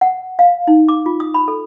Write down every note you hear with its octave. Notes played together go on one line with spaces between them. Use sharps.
F#5
F5
D#4
D6
F4
D#6
B5
A4